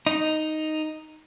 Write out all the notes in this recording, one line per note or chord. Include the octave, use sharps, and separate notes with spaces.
D#4